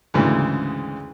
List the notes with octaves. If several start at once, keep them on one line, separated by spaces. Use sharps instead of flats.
D2 G#2 C#3 E3